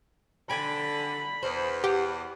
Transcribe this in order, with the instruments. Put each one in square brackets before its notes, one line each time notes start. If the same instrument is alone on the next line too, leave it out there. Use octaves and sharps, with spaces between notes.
[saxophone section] D3 [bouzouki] G5 G#5 [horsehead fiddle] B5
[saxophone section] E2 [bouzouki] C5
[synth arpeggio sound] G4 [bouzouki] F#5